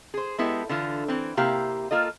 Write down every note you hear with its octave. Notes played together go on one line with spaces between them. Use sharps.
G#4 C5
G#3 B3 E4 G4 A4
D3 E3 F4
E3 C4
C3 A#3 E4 G4 F5
A#3 F4 A4 D#5